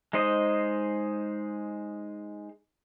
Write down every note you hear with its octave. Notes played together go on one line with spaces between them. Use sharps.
G#3 D#4 C5 D#5